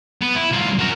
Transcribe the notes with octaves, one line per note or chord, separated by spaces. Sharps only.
B3
E4
C2 F4
F#4 A#4